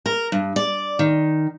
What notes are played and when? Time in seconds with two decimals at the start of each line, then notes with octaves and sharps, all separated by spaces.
0.06 A#4
0.32 G2
0.56 D5
0.99 D#3